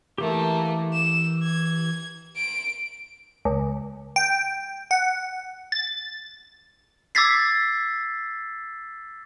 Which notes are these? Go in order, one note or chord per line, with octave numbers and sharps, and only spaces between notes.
E3 A3 A#3 G4
E7
G#6
D7
C#2
G5
F#5
A6
D6 E6 G#6 A6 B6 C7